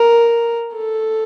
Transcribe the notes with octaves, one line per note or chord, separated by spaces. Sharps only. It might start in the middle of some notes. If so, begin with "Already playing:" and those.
Already playing: A#4
A4